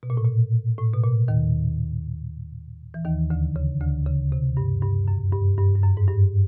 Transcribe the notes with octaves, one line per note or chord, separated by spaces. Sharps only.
B2
A#2
A2
A#2
A2
B2
A#2
D#2 D#3
E3
D#2 D#3
D2 D3
C#3
D2 D3
C#3
C3
G2
G2
F#2
G2
G2
G2
F#2
G#2
G2